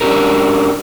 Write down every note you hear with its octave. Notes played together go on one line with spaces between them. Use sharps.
C#4 D4 G4 A#4